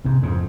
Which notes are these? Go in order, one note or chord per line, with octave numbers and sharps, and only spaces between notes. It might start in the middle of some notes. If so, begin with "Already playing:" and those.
G#2 C3
F2 G#2